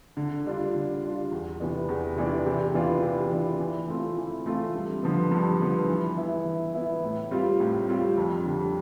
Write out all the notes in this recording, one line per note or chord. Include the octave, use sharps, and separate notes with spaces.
D3
G3 D4 F4
D3
G3 D4 F4
E2
C3 E3 B3 D4
E2
C3 E3 B3 D4
C3
E3 B3 D4 F4
C3
E3 B3 D4 F4
E3
A3 C4 F4
E3
A3 C4 F4
G2
D3 F3 B3
G2
D3 F3 B3
E3
B3 E4
E3
B3 E4
A2
G3 C4 F4
A2
G3 C4 F4
F2
D3 G3